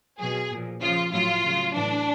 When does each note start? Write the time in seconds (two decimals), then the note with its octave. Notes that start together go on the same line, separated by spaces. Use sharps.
0.19 B2 F#3 G#4
0.50 A#2 F3
0.81 C#3 F3 F4
1.12 A2 F#3 F4
1.44 C#3 F#3
1.74 A2 E3 D4